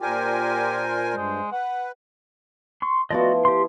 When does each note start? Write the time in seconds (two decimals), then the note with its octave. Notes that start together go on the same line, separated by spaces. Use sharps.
0.01 A#2 D4 F4 G4 A#4 C5 G#5
1.16 G2 G#3
1.52 B4 F#5
2.82 C6 C#6
3.11 F3 B3 E4 F#4 D5 D#5
3.45 G4 C6